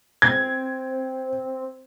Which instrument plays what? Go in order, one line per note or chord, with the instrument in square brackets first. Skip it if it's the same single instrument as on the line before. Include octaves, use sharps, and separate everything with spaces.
[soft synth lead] C4 [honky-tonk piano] G#6